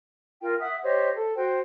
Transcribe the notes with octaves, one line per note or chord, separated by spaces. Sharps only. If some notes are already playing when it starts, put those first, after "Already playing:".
F4 A#4 G5
E5 F#5 D#6
G4 C5 C#5 D#5
A4
F#4 C5 G5